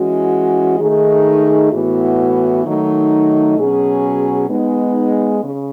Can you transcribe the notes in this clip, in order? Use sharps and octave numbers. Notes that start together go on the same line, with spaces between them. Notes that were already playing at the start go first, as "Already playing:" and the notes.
Already playing: E3 G#3 C#4 F#4
D#3 A3 D#4 G#4
A2 E3 B3 F#4
D#3 F#3 A3 D#4
B2 F#3 C#4 G#4
G#3 B3 D#4
C#3